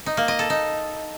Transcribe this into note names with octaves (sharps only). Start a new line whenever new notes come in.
D#4
A#3
D#5
A4
D#4